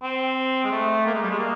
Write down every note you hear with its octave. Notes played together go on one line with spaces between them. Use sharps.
C4
G#3
A3
A#3
G#3
G3
G#3
A#3